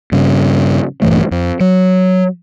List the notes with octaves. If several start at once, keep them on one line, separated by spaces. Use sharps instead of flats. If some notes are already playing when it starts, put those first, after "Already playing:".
G2 C#3
A#1 G2 E3 A3
F2
F#3